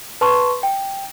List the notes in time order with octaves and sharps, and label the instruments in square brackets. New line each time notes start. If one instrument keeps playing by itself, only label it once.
[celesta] B4 A5 C6 C#6
G5